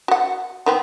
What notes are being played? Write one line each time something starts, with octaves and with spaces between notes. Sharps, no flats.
F#4 F#5
D#3 B3 C4